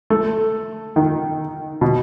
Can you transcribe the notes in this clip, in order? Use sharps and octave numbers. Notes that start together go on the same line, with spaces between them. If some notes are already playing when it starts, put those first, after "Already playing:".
A3
D#3
B2